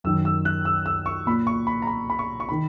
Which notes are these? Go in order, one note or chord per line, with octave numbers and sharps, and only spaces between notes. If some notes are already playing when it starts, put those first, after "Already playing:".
F#2 D#3 E6
E6
F#6
E6
E6
C#6
A#2 B5
C#6
B5
A#5
B5
B5
C#6
C#6
D#3 B5